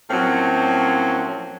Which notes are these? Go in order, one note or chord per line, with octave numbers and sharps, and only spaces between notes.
A2 F3 F#3 A#3 C4 C#4